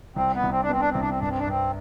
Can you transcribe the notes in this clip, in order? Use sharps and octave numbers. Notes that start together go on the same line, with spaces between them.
C2 C4
B3
C2
C4
D4
B3 C4
D4
C2 C4
D4
C4
G2 D4
C4
D4
G2 C4